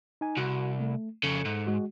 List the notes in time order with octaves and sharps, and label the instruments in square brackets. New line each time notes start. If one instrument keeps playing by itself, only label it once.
[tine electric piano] D#4 G#5
[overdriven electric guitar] C2 [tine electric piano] F#4
[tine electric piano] A3
[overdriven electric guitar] F2 C#3 [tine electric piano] A4 C#7
[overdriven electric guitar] G#2
[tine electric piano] G#3 F#4